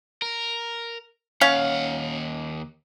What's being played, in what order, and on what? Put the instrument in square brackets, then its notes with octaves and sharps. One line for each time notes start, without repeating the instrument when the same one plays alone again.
[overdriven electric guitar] A#4
[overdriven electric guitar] D#2 F#5 [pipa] C#4 F5